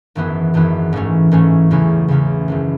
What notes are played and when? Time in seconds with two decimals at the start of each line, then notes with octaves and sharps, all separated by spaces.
0.15 G#1 F#2 E3 B3 E4
0.54 G#1 F#2 E3 B3 E4
0.93 A1 G#2 E3 A3 C#4
1.31 A1 G#2 E3 A3 C#4
1.71 E2 C#3 F#3 C#4 E4
2.08 E2 C#3 F#3 C#4 E4
2.48 G#1 F#2 E3